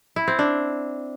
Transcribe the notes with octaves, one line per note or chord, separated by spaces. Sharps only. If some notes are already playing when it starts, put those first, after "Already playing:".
E4
C4
D4